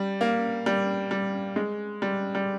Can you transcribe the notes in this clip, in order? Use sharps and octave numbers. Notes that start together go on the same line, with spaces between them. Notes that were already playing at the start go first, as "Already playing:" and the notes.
Already playing: G3
A#3
G3
G3
G#3
G3
G3